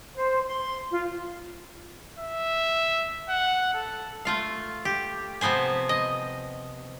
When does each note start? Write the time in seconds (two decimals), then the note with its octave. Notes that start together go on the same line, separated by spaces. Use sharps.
0.15 C5
0.46 C6
0.91 F4
2.19 E5
3.29 F#5
3.74 A4
4.25 A3 F4 F5
4.85 G4
5.41 C3 F3 B3 C5 G#5
5.89 D#5